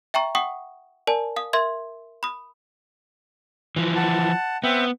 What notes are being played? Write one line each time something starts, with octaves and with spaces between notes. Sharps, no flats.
E5 G5 A#5 C#6
F#5 G5 C#6 D#6
A#4 D5 G#5 A5
F5 D#6
A#4 E5 C6 G#6
B5 D#6
E3 F3
F#5 A5
B3 C4 E5 G5